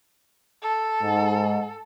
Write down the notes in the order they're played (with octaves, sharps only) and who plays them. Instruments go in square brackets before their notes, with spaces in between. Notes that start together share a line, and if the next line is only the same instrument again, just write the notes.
[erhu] A4
[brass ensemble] G#2